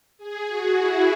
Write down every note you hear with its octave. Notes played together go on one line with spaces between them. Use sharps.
G#4
F#4
E4